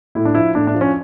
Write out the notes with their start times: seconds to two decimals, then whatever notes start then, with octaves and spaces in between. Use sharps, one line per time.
0.15 A2 E4
0.25 D4
0.35 F3 E4
0.55 A2 D4
0.67 D4
0.75 F3
0.81 C#4